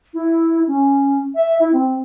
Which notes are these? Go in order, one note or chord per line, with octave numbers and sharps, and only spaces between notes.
E4
C#4
E5
E4
C4